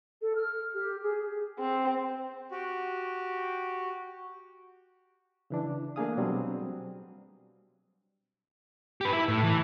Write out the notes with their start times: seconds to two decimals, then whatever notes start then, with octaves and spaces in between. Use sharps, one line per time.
0.21 A4
0.35 F6
0.73 G4
1.02 G#4
1.59 C4
2.51 F#4 G4
5.50 C#3 E3 D4
5.96 A3 A#3 D4 G#4 F5 D#6
6.17 B2 F#3 G3 C4 D4
9.01 G4 B4
9.13 E4
9.29 A2
9.44 E3